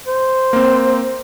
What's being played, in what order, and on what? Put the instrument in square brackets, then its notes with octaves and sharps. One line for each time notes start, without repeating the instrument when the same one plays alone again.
[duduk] C5
[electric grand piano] A#3 C4